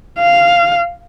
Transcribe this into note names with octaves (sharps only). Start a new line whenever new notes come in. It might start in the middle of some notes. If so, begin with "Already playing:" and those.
F5